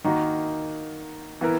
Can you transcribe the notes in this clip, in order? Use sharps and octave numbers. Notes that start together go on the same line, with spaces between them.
D#3 A#3 D#4 F#4
E3 B3 E4 A#4